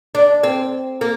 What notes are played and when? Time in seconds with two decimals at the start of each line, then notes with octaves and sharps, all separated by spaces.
0.15 D4
0.43 C4
1.01 A#3